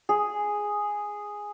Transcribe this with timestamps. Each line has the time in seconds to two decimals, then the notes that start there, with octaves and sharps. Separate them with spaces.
0.09 G#4